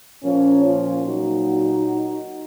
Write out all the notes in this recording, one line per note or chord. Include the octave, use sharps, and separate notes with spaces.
A#2 F3 A#3 C#4
C#4 F4
A#2 F#3 D#4 F#4